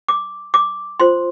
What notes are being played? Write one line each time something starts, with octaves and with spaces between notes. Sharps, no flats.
D6
D6
F4 C5 C6